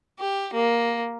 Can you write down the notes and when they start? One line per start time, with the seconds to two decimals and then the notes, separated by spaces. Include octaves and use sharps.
0.19 G4
0.54 A#3